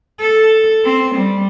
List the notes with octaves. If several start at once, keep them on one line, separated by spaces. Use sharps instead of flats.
A4
C4
G3